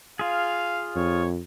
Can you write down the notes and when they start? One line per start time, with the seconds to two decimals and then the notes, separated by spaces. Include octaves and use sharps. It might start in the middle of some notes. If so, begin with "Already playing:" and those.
0.19 F4 G#4 F5
0.96 F2 C#5